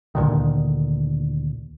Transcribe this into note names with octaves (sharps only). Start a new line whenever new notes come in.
D2 A#2 D3 D#3